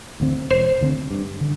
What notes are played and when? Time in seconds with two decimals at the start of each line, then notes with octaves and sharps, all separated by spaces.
0.20 D2 D3 C4
0.51 E1 C5
0.81 D2 D3 C4
1.11 G2
1.41 D3